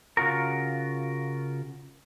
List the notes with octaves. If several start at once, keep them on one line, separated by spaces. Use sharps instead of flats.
C#3 F4 F#4 A#4